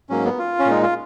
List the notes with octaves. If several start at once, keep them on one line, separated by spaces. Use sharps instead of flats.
G#2 F#3 A#3 C#4
B3
F4
C#4
A#2 G#3 D#4
F4